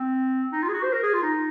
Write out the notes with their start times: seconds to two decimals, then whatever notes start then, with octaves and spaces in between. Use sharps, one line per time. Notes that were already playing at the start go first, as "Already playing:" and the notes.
Already playing: C4
0.52 D#4
0.63 F4
0.69 G#4
0.73 F#4
0.83 C5
0.93 A#4
1.03 G#4
1.13 F4
1.23 D#4